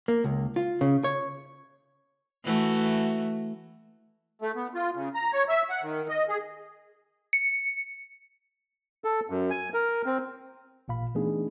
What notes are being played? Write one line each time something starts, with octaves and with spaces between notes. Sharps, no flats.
A#3
C#2
F4
C#3
C#5
E3 A3 F#4
A3
B3
F4
C#3
A#5
C#5
E5
F#5
D#3
D#5
G#4
C#7
A4
F#2
G#5
A#4
C4
A1 A#2 F5 B5
E3 A3 B3 D4 D#4 G#4